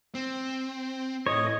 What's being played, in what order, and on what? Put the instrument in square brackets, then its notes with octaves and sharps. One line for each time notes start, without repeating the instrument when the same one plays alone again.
[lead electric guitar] C4
[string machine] A2 [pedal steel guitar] C#5 [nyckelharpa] D#5